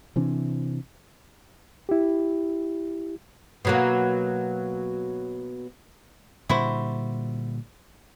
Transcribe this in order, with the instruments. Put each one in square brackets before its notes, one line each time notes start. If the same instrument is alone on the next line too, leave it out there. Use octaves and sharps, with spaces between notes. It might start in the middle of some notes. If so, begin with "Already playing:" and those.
[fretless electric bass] C3 E3 C4 D4
[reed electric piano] E4 G4
[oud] B2 F#3 A#3
[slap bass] A#2 D3 G3 [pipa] E4 F#4 C5